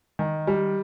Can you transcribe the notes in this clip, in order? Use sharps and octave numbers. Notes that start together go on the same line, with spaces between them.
D#3
G3